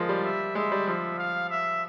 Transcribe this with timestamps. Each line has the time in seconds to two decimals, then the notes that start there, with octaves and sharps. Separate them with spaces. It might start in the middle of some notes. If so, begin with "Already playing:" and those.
Already playing: F3 G#3 A#3
0.09 G3
0.24 E5
0.55 G#3 E5
0.72 G3
0.87 F3 E5
1.18 F5
1.50 E5